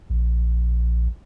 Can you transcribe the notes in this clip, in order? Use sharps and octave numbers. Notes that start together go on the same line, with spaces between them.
A#1